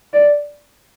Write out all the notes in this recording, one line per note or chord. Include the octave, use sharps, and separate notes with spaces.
D5